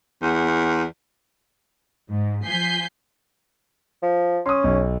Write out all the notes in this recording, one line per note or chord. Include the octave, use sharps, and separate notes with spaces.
E2
G#2
F3 G#5 G6 B6 C7
F3
C#4 C6 C#6 D#6
B1